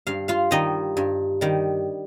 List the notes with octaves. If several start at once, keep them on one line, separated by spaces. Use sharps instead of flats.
G2 F5
F4 F5
D#3 G3 D#4 D#5
G2
D#3 G3